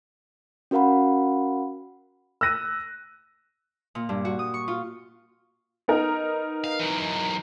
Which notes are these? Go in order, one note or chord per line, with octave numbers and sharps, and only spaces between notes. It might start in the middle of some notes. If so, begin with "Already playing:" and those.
C#4 F#4 A#4 F5 F#5 B5
E6 F#6 A#6 D#7
A#2
G2
F#4
D#6
C#6
F4
B3 D#4 A#4
F5
E3 F#3